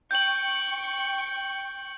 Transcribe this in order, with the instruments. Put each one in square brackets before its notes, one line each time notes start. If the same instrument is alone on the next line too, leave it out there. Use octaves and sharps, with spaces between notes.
[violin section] G5 C#6 C#7 [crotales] G6 F#7